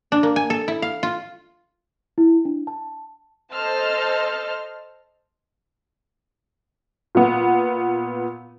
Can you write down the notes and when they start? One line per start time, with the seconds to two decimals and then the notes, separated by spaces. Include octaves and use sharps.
0.12 D4
0.23 A#3
0.36 G#5
0.50 A4
0.68 E4
0.82 F5
1.03 F4
2.18 E4
2.45 D4
2.67 A5
3.53 A4 C5 D#5 A5 F6
7.15 A#2 B3